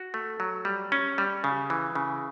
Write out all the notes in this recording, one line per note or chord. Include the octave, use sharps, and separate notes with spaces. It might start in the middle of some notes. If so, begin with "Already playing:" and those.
Already playing: F#4
A3
F#3
G3
C#4
G3
C#3
E3
C#3